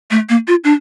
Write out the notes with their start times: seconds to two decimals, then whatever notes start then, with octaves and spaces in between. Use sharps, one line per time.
0.11 A3
0.29 A#3
0.48 F4
0.64 D4